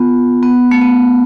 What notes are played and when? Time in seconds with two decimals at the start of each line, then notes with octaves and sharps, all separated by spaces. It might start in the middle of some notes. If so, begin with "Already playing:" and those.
Already playing: B3 F4
0.43 B3
0.71 A3
0.81 B3